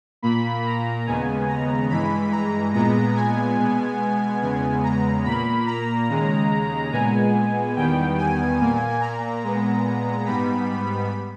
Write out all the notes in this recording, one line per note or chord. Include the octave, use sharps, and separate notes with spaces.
A#2 A#3 B5
A#5
D#2 C#3 G#3 B3 G#5
A#5
G2 E3 G#3 B5
A#5
A#2 G#3 B3 A#5
G#5
B2 G#3 B3
E2 C#3 G#3 B3 G#5
A#5
A#2 A#3 B5
A#5
D#2 C#3 G#3
A#2 G#3 B3 G#5
E2 D#3 G3 B3 G5
G#5
A#2 A#3
A#5
A#2 G#3 B3
G#2 G3 B3 B5